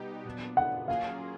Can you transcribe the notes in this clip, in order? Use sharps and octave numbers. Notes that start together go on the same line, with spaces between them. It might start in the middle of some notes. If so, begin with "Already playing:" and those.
Already playing: B2 G3 B3 D#4 G4
A#2 F#3 B3 D4
F#5
F#3 A#3 C#4 F4 G#4 F5